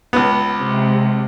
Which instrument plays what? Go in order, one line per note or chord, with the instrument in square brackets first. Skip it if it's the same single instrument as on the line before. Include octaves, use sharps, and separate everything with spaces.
[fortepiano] C#2 B3
[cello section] C3 G#3